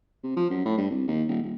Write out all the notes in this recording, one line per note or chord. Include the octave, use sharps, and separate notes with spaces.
C3
F3
F#2
A2
G2
C2
D#2
D#1
D#1